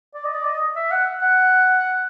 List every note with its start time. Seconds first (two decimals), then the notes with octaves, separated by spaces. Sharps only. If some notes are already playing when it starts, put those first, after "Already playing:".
0.14 D5
0.25 D#5
0.34 D5
0.45 D#5
0.76 E5
0.91 F#5
1.22 F#5